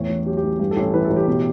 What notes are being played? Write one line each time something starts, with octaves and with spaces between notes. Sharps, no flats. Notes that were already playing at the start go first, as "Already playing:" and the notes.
Already playing: E2 A2 C#5
A1
F#3 G4
G4
A1
G2 G4
A4
A1
A4
E3 B4
A4
A1
G4
B2